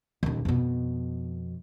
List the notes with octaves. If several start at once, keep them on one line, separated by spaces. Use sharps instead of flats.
D#1 D#2
F2 B2